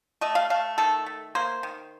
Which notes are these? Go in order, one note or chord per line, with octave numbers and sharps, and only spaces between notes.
A3 D#5
F5
A3 F5
D#3 A4
A3
A#3 C5
D#3